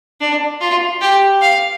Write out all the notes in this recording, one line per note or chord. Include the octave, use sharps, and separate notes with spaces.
D4
F4
G4
F5